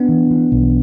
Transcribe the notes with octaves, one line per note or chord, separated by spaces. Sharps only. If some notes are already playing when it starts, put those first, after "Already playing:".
Already playing: B3 D4
E3
E3
B1